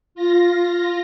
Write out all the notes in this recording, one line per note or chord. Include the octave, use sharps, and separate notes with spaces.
F4 A#6